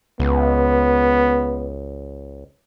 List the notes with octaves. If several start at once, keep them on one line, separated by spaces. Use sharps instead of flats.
C#2 B3